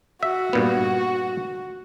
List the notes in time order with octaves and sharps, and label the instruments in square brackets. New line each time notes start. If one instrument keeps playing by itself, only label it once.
[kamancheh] F#4 [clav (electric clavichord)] E5
[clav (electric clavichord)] G2 A#2 B3